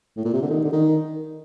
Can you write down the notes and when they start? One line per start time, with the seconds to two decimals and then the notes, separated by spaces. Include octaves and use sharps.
0.17 A2
0.25 A#2
0.33 C3
0.42 D3
0.50 D#3
0.64 D3
0.73 D#3